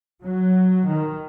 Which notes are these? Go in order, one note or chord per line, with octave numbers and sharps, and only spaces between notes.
F#3
D#3